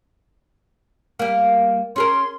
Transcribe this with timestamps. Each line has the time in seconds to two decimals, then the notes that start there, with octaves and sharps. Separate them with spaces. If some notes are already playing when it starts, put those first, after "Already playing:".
1.19 G3 A#3
1.96 C#4 G#4 A#4 C6